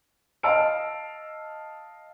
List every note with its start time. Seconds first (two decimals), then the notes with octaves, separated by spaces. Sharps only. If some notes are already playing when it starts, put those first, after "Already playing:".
0.43 D#5 F5 A5 E6 F6 D7